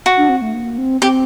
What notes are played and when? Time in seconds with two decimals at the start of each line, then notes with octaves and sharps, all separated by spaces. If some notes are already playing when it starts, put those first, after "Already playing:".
0.06 F#4
0.17 D4
0.29 C4
0.42 A3
0.54 A#3
0.78 C4
1.01 C4 G4